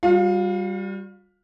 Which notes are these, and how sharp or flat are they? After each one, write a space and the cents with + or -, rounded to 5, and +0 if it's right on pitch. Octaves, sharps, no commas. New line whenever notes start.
G3 +0 F4 +45 F5 +20